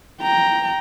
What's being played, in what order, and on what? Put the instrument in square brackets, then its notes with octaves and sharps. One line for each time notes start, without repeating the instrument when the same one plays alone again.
[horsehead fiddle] G5 A#5